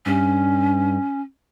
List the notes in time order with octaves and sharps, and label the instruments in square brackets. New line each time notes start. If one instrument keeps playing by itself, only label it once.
[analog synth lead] G2 [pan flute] C#4